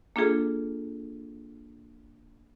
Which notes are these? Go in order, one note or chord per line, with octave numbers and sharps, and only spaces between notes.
A#3 D4 F4 G#4 A4